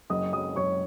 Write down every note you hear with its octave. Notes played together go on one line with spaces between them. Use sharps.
F#1 D#5 D#6
F#3 D#5 D#6
F#1 C#5 C#6